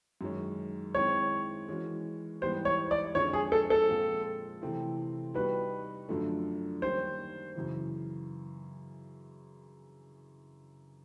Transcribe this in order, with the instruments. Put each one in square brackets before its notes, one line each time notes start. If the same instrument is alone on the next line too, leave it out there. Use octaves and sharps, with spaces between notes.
[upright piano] F#2 D#3 G#3 C#4
[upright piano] D#3 G#3 C4 E4 [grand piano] C#5
[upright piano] E3 G#3 C#4 F#4 A#4
[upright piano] G#2 E3 G3 B3 [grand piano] C5
[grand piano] C#5
D5
[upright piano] F2 D3 F3 G#3 C#4 [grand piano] C#5
[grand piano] G#4
A4
A4
[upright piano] A#2 F3 G#3 C4 F4
C3 E3 A3 C4 E4
[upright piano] G3 B3 D#4 F#4 [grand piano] B4
[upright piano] F#2 D3 F3 A3 D4
[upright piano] D#3 G3 A#3 C#4 [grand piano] C5
[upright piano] F#2 C#3 E3